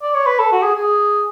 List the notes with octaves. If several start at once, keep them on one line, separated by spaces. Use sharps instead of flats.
D5
C#5
B4
A4
F#4
G#4
G#4